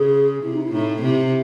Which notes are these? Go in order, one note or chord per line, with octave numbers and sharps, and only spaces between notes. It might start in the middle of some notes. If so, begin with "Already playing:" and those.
Already playing: C#3 G#4
C3 E4
D#4
E4
A2 D#4
C3 E4